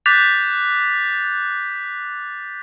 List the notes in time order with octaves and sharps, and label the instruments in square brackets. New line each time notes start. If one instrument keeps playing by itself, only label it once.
[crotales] D6 F#6 G6 A6 B6 F7